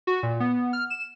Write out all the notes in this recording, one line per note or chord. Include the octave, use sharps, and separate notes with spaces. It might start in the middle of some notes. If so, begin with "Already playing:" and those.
F#4
A#2
B3
F6
E7